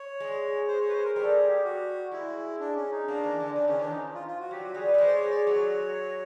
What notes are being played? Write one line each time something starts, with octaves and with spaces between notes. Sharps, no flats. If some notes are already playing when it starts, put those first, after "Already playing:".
Already playing: C#5
G#3
C5
C#5
B4
C5
A#4
G3 A#4
A4
G#4
G4
F#4
G#3 E4
D4
C#4
D#4
A#3 D4
E3
D3
C#3 D4
D#3 C#4
E3 D4
F3 D#4
F4
F4
F#4
F#3 G4
F#4
G3 G#4
B4
A3
G#3 C5
D5
C#5
D5
F#3 C#5